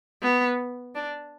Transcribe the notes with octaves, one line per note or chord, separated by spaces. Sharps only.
B3
D4